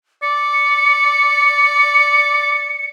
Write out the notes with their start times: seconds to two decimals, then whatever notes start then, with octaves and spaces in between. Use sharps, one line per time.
0.22 D5 C#7